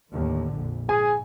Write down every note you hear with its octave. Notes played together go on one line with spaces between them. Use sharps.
D#2 A2 D3
A#1 F2
G#2 G#4 G#5